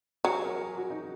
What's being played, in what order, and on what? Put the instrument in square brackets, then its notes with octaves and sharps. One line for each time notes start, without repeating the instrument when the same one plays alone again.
[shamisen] F#3 [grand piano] G#4
[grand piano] A#4
G#4
F#4
D#4